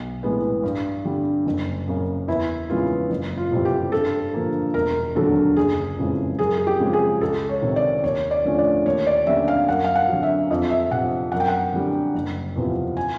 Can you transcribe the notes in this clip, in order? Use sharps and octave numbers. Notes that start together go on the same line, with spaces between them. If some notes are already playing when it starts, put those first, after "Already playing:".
Already playing: B1
A2 E3 G#3 B3
G2
D3 G3
F#1
F#2 C#3
E2 E4
C#3 E3 G#3 B3 F4
F#1
F4
F2 C3 E3 G3
G4
G2 A4
D3 F3 A#3
E1 A#4
D#2 D3 F#3 A4
F#1 G#4
F2 C#3 E3 G#3
F#2 G#4
G#4
G4
C#3 F3 G#3
G#4
C#2 A4
C#5
C3 D#3
D5
D#2 C#5
D5
D3 F3 A3 C#4
D5
D#2 C#5
D5
D3 G3 A#3 C#4 E5
F5
F#2 F#5
F5
F#5
D3 F#3
E5
F2 D#5
E5
C3 F3 F#5
F#2 F#5
G5
F#5
D3 G3
F#1
E2 C3 F3
G#5